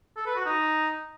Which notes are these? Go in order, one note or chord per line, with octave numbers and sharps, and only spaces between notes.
A4
B4
F#4
D#4